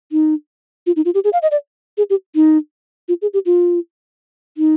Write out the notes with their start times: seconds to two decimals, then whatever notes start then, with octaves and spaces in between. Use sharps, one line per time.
0.12 D#4
0.87 F4
0.96 D#4
1.05 F4
1.14 G4
1.24 G#4
1.33 F5
1.42 D#5
1.51 D5
1.98 G#4
2.10 G4
2.35 D#4
3.09 F4
3.22 G#4
3.34 G4
3.46 F4
4.58 D#4